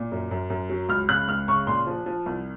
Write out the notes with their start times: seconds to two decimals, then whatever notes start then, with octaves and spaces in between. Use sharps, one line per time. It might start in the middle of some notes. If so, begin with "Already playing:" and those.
Already playing: A#2
0.12 F#2
0.31 F#2
0.50 F#2
0.70 F#3
0.89 C#2 F6
1.09 C#3 F#6
1.28 C#2 F6
1.48 C#3 C#6
1.67 A#2 C6
1.87 F3
2.06 F3
2.26 C2